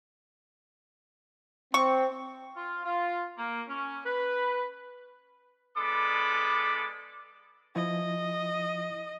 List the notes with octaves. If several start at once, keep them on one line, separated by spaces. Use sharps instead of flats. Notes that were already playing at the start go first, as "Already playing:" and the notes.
C4 C#6
F4
F4
A#3
C#4
B4
G#3 B3 D4 A4 B5 D6
F3 E4 D#5